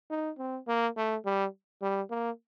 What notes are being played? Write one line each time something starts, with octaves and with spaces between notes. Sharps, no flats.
D#4
C4
A#3
A3
G3
G3
A#3